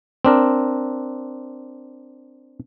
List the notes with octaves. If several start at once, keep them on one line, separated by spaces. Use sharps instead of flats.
C4 D4 A#4